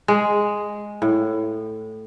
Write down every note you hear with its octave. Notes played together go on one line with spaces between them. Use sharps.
G#3
A2